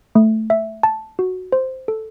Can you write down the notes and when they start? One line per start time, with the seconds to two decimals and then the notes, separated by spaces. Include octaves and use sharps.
0.15 A3
0.50 E5
0.83 A5
1.19 F#4
1.52 C5
1.88 A4